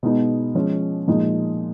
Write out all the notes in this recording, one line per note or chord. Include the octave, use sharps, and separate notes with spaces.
B2 G#3 B3 D#4
F3 G#3 C#4
A#2 F3 G#3 D#4